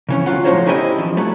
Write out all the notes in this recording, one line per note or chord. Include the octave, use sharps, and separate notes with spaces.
C#3 E3 C#4
D2 F#3 F4 F#5
A2 F3 F#3 D#4 C5 C#5
C#4 D#4 E4 G4 B4 D#5
E3 F3
F#3 G3 A3